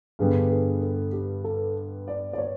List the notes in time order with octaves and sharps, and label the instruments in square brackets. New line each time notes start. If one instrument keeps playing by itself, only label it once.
[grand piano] G2 D3 G3 B3 [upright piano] G#4
[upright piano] G#4
A4
G4
A4
D5
D5
C#5